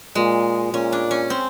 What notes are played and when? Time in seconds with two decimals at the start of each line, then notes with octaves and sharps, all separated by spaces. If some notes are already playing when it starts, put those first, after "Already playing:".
0.15 A#2 G#3
0.73 A#2 C#4
0.92 D4
1.11 C#4
1.30 C4